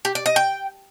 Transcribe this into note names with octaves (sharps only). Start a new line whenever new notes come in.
G4
D5
D#5
G5